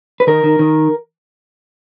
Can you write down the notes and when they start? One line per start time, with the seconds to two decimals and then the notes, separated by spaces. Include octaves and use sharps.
0.20 B4
0.27 D#3 A#4
0.44 D#3
0.59 D#3